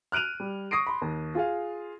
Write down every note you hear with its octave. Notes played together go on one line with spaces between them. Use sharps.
F6 F#6 D7 D#7 F7
G3
C#6 D#6 A#6 C7 D7
B5 C6
D#2
F4 G#4 F5